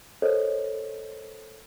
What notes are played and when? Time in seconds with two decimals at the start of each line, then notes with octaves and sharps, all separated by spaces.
0.22 A4 A#4 C5 C#5 D#5